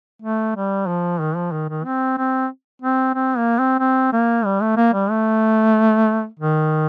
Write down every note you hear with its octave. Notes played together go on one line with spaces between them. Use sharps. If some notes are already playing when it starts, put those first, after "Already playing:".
A3
G3
F3
D#3
F3
D#3
D#3
C4
C4
C4
C4
A#3
C4
C4
A#3
G3
A3
A#3
G3
A3
D#3